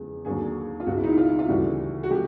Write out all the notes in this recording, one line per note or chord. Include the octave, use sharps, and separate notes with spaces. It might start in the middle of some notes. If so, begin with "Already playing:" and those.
Already playing: E2 C#3 F3 G#3
D#2 D3 F#3 G#4
F4
C#2 B2 G#3 F#4
E4
D#4
E4
F4
E4
F4
D2 C#3 E3 G3 F#4
F#4
C3 F3 G#3 G4